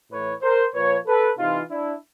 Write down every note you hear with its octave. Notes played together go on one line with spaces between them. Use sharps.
A2 E3 B4 C#5
A#4 C5
A#2 F3 B4 C#5
A4 B4
C3 E3 D#4 F4
D4 E4